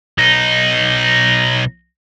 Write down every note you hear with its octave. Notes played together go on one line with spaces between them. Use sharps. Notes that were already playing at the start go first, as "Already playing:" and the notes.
B1 D#4